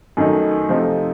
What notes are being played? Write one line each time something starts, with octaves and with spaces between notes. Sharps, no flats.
F#2 D#3 A3 D#4
C3 F3 A3 D#4